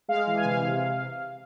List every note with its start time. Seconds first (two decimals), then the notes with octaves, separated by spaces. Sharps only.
0.08 G#3 F5
0.27 E3
0.37 G#5
0.45 C3 F5
0.64 C3